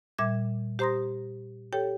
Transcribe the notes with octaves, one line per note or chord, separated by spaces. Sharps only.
A#2 G3 E5 D6 G#6
G4 C5 A#5 C6 D#6 A#6
G4 A4 C#5 G5